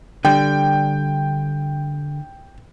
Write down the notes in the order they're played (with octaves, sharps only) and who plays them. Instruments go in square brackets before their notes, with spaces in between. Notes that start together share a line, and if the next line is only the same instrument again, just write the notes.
[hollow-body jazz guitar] D3 G3 [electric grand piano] G5